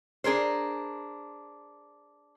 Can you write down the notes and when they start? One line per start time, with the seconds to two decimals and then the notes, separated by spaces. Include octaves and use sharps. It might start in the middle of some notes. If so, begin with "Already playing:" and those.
0.24 D4 G#4 A#4 C5